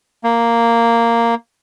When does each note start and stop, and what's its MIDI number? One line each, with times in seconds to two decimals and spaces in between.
0.24 1.35 58